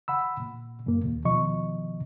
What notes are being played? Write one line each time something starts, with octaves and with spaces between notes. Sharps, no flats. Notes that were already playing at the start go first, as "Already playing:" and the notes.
F#5 B5 E6
A#2
F#2 A#2 A#3
D#2
B2 D#3 F3 D#5 C#6